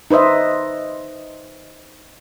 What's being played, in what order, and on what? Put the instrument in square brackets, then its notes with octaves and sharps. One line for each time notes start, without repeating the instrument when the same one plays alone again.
[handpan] D#4 B4 C5 D#5 E5